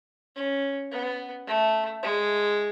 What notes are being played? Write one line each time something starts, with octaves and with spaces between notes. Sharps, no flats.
C#4
B3
A3
G#3